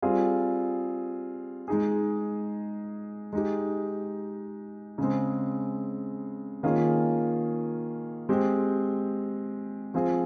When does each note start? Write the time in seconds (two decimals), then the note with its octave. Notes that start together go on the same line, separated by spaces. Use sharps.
0.02 G3 C4 F4 G#4
1.68 G#3 D#4 G#4
3.33 G#3 D#4 G4
4.98 C#3 G#3 C4
6.63 D#3 A#3 C#4 F4 G#4
8.29 G#3 C4 G4
9.94 F3 C4 F4 G#4